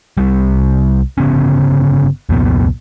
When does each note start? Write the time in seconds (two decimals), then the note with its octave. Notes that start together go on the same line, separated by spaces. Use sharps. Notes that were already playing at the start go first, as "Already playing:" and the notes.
0.17 C2 G3
1.18 G1 C#3 B3 C#4
2.29 C2 F2 A#2 B3